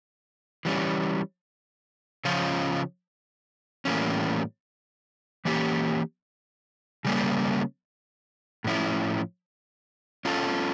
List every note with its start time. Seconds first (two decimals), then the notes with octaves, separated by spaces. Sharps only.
0.65 E3 G3 C#4
2.25 C#3 F3 C#4 F4
3.85 A2 E3 G3 A#3 C#4
5.45 E3 A#3 C#4 G4
7.05 C#3 G3 A#3 C#4
8.64 A2 F3 C#4 E4
10.25 C#4 F4 A4